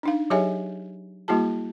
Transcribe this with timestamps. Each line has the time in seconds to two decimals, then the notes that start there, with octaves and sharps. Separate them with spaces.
0.03 D4 D#4 F5
0.30 F#3 G4 G#4 C#5 E5 G#5
1.28 G3 A#3 E4 F#4 G#4 A5